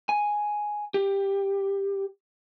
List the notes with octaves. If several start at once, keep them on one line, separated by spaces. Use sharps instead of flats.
G#5
G4